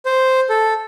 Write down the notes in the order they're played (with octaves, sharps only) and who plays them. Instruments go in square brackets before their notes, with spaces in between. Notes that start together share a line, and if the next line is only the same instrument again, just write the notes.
[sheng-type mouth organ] C5
A4